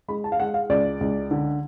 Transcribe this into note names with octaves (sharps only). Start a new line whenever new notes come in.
G#3 B5
A5
F5
G#3 F#5
F5
C#2 D5
C#2
D3